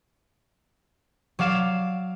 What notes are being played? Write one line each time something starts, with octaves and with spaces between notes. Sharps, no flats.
F#3 D5 F5 E7